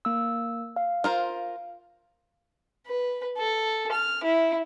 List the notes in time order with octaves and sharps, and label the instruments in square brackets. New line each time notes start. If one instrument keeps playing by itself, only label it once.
[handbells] A#3 E6
F5
[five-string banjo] F4 A#4 C5
[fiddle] B4
A4
F6
E4